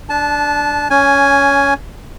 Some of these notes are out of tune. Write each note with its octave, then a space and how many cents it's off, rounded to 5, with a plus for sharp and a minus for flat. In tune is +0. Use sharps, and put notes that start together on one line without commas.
D4 +0 A5 -20
C#4 +15 G#5 +0